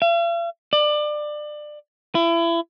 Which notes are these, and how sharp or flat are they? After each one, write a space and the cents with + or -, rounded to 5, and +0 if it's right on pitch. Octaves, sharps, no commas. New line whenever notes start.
F5 -45
D5 +25
E4 +30